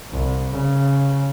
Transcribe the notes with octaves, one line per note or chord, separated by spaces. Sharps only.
C2
C#3